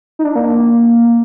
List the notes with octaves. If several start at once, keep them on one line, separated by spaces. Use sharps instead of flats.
D#4
D4
A#3